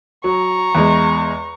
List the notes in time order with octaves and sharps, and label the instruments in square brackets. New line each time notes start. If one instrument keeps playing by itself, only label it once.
[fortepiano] F#3 [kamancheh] A#5 C#6
[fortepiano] E2 G#3